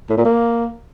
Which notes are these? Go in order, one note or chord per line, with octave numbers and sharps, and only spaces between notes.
A2
A#2
A#3